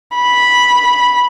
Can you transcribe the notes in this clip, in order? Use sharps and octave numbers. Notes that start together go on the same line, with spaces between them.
B5